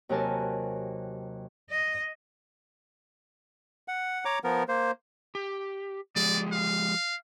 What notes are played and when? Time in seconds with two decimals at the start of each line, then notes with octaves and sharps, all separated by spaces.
0.09 D#2 C3 F#3 A#4 G#5 A5
1.70 D#5
3.88 F#5
4.25 C#5 A#5 D6
4.44 F3 B3 A#4
4.68 A#3 C5
5.35 G4
6.16 F3 G#3 G4 D5
6.52 F5